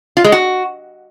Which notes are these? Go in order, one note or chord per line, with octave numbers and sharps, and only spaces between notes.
F4
G#3
F#4